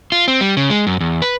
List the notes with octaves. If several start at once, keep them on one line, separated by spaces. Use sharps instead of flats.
F4
C4
G3
C#3
G#3
F#2
E2
B4